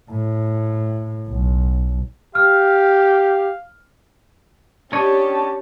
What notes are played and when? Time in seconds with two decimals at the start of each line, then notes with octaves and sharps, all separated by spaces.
0.11 A2
1.28 B1
2.35 G4 F5 F6
4.93 C#4 D4 G4 C#5 D#5 A5